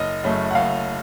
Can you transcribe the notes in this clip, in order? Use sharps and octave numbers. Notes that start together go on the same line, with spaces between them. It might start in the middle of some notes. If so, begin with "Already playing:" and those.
Already playing: F#1 D#5
F#2 C#3 A3
F#5
F#1 F5